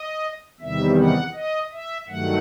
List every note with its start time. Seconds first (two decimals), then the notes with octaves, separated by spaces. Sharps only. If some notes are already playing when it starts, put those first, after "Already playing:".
Already playing: D#5
0.60 E2 C3 D#3 G3 E5
0.98 F#5
1.34 D#5
1.71 E5
2.08 G2 D#3 F#3 A3 F#5